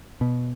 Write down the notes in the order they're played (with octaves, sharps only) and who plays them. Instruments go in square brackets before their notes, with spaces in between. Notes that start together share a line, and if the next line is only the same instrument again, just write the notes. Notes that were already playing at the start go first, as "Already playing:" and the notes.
[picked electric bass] B2